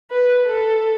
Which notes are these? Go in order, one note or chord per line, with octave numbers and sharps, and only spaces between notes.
B4
A4